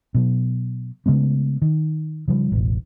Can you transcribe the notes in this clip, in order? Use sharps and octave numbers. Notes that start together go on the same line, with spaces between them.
B2 F#3
C#3 G#3 A3 B3
D#3
C#3 F3 G3
E1 A1